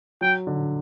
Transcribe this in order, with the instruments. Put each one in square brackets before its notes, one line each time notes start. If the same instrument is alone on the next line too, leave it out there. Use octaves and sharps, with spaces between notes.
[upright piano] F#3 [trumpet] G5
[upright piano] D3